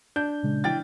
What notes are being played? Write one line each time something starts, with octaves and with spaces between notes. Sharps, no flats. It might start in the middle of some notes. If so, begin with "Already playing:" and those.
D4 G6
A#2 C#3 G#3
E3 G5 F6 A6